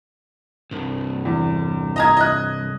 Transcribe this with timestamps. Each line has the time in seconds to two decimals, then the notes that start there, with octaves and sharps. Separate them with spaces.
0.71 C2 G2
1.25 E2
1.96 D#5 A#5 G#6
2.17 D#5 F#6